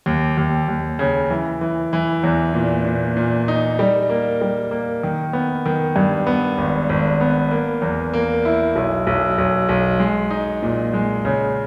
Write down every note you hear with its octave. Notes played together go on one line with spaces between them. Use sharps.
D#2
D#2
D#2
C#3
E3
E3
E3
E2
A#2
A#2
A#2
D#4
G3
A#3
G3
A#3
D#3
B3
D#3
G2
B3
G#1
G#1
B3
A#3
E2
A#3
E4
B1
B1
B1
B1
G#3
D#4
A#2
G#3
C#3